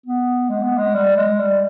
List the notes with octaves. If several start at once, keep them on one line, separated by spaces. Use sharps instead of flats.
B3
G#3
B3
G#3
G3
G#3
G3